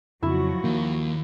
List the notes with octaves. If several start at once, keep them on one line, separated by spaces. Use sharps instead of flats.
F2 C#3 F3 F#3 E4 F#4
D#2 D#3 A#3